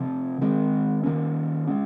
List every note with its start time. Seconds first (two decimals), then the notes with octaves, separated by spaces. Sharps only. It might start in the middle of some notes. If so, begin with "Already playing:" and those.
Already playing: C3 F3 C4
0.41 D#3 G#3 C4
1.03 D#3 A#3 C#4
1.67 G#3 C#4